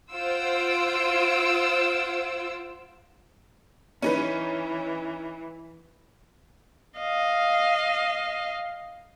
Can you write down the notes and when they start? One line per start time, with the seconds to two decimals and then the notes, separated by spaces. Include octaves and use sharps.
0.14 F4 C5 F#5 E6 D7
4.02 E3 C#4 D#4 B4
6.99 D#5 F5